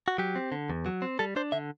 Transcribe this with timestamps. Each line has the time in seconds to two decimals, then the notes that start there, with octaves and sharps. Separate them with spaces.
0.08 F#4
0.18 F#3 G4
0.35 C4
0.52 D3
0.70 E2
0.86 F#3
1.02 C4
1.19 G3 A4
1.36 D4 C5
1.52 D3 E5